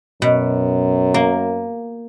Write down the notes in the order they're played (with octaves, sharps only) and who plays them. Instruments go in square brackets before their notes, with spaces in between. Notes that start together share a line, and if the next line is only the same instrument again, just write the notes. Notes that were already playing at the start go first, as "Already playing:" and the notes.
[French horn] F#2 [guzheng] B2
[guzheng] A#3